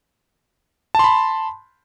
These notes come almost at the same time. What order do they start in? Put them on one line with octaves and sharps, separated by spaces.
A5 C6 B5